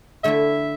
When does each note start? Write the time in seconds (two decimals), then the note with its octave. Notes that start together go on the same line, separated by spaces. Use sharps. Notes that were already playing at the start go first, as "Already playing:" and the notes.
0.23 D3 A3 E4 E5